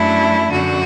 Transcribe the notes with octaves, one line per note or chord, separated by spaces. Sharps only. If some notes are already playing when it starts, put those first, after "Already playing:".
Already playing: F#2 F#3 A3 D4 E4
F#2 D3 F#3 F#4